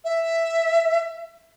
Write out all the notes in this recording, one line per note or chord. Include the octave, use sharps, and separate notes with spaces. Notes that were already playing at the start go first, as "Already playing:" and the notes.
E5